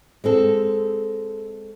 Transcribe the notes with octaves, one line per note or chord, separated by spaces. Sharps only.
G#3 C4 A4